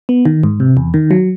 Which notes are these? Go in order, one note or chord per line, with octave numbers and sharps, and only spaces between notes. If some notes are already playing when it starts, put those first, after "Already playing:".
B3
D#3
G#2
C3
E2
D#3
F#3